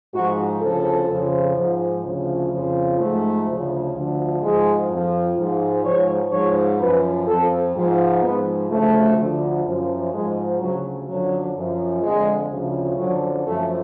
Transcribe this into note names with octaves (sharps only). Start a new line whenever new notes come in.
G#2 F3 F#4
D2 C#3 F3 A4
F2 C#3 F3
G#2 F3
D2 C#3 F3
F2 C#3 F3
G#2 F3 A3
D2 C#3 F3
D2 D3 F3
G#2 F3 G#3
F2
F3
G#2 F3
G#2 F3 C#5
G#2 F3 C#5
F#2 F3 B4
F2 F3 A4
G#2 F3
G#2 F3 B3
D2 C#3 F3 A3
D2 D3 F3
F#2 F3
G#2 F3 G#3
D2 C#3 F3 F#3
F#2 D3 F3 F#3
F#2 F3
F2 D3 F3 G#3
D2 C#3 F3
F#2 D3 F3 F#3
F#2 F3 A3